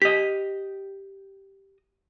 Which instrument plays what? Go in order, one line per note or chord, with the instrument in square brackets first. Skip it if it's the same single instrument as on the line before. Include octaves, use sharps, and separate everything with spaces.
[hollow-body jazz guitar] G4 D#5 [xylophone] B6